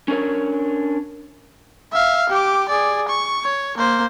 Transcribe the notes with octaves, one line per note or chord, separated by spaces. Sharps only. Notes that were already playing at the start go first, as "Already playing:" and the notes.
C#4 D4 A#4 C#5
E5 F5
G4 D6
G#4 D5
C#6
C#5
A#3 C5